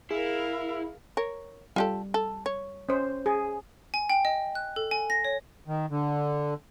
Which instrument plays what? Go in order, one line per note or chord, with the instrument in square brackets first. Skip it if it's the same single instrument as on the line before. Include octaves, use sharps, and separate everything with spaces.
[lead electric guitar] E4 [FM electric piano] G#4 [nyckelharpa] A#4 F5
[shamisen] A#4 C#5
[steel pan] G3 [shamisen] F4 G4 A4
[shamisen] A4
C#5
[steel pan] C#4 C5
G#4
[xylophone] G#5
G5
D#5
F#6
A4
G#5
A#6
C#5
[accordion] D#3
D3